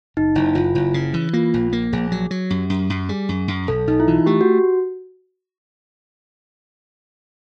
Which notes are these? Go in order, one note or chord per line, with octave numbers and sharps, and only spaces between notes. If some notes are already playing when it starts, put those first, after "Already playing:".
F#1 D#4
F#1 E4
F#1 F4
F#1 E4
C#3
E3
A#3 F4
A#1
A#3
A#1 G#4
F#3
F#3
F#2 G4
F#2
F#2
G3 G#4
F#2
F#2
B1 A4
B1 D#4
E4
E3 F4
A3 G4
F#4